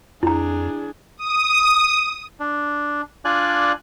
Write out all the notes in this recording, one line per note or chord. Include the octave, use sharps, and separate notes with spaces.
F2 D4 E4 G#4 A#5
D#6
D4
D4 F4 D5 G#5 F#6